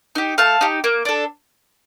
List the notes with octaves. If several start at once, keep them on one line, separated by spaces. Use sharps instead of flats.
D#4 G4
A3 F5 A5
D#4 G4
A#3
D4 A4